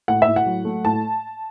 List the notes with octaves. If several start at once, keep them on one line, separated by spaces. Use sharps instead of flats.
A2 F#5
E5
A2
F#5
F#3
A3
A2 A5